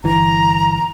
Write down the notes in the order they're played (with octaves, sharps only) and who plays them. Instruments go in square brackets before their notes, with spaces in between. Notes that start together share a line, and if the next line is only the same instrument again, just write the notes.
[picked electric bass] G1 E3 [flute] A#5